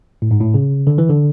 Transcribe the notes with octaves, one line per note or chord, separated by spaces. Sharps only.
A2
G#2
A2
C#3
D3
E3
D3